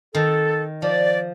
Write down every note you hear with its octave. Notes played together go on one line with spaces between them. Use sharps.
D#3 A4
F3 D5